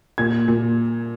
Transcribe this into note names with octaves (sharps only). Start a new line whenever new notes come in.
A#2 G#6
A#2